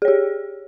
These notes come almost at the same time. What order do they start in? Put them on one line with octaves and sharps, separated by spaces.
G#4 C#5 G4